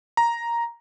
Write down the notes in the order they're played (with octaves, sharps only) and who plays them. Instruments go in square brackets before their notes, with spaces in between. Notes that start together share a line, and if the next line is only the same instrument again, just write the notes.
[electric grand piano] A#5